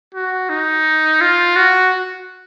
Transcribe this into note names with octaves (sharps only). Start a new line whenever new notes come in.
F#4
D#4
F4
F#4